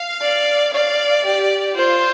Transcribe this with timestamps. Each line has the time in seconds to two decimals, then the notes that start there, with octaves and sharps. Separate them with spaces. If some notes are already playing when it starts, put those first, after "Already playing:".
Already playing: F5
0.22 D5
0.74 D5 F5
1.25 G4
1.76 F4 C5